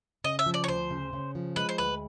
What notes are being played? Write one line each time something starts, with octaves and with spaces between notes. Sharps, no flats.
C#3 D#5
E5
F3
D5
C#5
D2 C5
C#3
C#3
F3
G#3 B4
C5
D2 B4